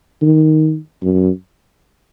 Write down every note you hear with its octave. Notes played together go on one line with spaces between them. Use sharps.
D#3
F#2